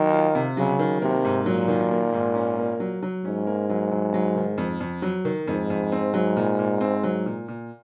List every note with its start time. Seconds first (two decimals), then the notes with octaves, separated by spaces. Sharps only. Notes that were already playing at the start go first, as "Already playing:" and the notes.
Already playing: D#3 F#3
0.13 F4
0.35 C3
0.57 C#3 F#3
0.79 D#3
1.02 C3 A#3
1.25 G#2
1.46 A#2 F#3
1.68 D#3
1.91 A#3
2.13 G#2
2.35 C#4
2.58 A#3
2.80 F#3
3.03 F#3
3.25 G#2 C#4
3.47 A#3
3.70 F#3
3.91 F#3
4.14 F#3
4.36 D#3
4.58 F2
4.80 F2
5.02 F#3
5.25 D#3
5.47 F2 G#2
5.70 F2
5.92 C4
6.14 F#3
6.37 A#2
6.59 A#2
6.81 C4
7.04 F#3
7.26 A#2
7.48 A#2